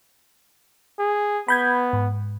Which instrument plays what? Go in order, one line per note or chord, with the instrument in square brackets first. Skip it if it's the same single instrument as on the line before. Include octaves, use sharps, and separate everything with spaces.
[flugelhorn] G#4
[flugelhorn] B3 [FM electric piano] B5 G6 G#6
[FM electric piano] G#2